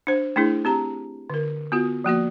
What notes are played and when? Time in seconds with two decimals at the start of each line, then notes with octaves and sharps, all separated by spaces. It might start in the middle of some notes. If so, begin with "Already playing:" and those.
0.07 D4 C5
0.36 A3 D4 E4 G#4
0.65 C4 G4 A#5
1.30 D3 A#4
1.72 B3 F4 F#4
2.04 F3 A#3 F#4 D5